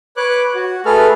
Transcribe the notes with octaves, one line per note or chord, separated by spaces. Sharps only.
B4 C#5 D6 F#6
F#4
A3 G#4 A4 B4 F6